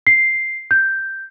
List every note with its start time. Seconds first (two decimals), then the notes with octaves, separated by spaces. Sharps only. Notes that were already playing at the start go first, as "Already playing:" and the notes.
0.07 C7
0.71 G6